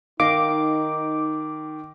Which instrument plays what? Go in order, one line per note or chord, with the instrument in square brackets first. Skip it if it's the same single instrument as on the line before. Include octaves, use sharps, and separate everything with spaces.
[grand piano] D#3 [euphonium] D#4 [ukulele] D#5 F5 [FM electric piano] D6